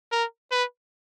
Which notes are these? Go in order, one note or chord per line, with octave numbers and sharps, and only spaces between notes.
A#4
B4